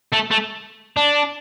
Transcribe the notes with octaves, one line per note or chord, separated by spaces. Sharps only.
A3
A3
D4